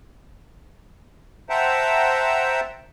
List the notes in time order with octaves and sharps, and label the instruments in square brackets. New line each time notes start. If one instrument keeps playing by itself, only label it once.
[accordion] C5 E5 F#5 G5 A5 A#5